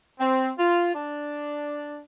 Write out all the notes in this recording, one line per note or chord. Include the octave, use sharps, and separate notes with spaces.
C4
F4
D4